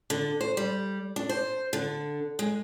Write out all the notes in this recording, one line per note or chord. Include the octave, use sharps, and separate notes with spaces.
D3
C5
G3
D4
C5
D3
G#3